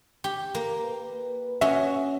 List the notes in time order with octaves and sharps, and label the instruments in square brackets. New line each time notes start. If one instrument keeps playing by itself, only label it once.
[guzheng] G4
A#3
[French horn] B4
[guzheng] C#4 F#4 D#5 [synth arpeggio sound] E5